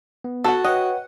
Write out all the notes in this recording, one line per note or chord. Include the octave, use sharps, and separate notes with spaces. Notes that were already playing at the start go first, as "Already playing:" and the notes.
B3
F#4 A4 F#5
B4 C#5 D#5 F#5 G5